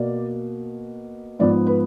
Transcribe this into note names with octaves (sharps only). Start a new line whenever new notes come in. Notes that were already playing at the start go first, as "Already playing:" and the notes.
Already playing: B2 A#3 D5
G#2 F3 B3 D5
B4